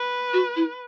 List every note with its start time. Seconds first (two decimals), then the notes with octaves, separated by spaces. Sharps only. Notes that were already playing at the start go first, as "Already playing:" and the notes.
Already playing: B4
0.33 F#4
0.56 E4